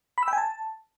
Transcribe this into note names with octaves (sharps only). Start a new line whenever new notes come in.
B5
E6
G5
G#5
A5